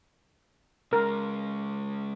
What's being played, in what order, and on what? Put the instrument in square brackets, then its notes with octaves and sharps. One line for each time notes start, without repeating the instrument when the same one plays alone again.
[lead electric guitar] C#3 G#3 [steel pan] A#4